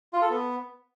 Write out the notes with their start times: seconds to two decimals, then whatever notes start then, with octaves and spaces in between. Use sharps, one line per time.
0.13 F4
0.22 A4
0.30 B3